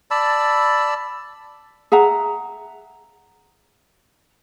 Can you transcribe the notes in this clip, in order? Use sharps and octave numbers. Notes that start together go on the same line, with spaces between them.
D5 A5 B5 E6
G#4 E5 F#5 A#5